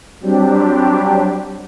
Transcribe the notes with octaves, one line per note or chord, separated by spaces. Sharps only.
F#3 G3 C4 D4 G4